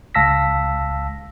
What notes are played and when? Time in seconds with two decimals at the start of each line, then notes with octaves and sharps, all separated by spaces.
0.15 C#2 F5 A5 E6 A#6 B6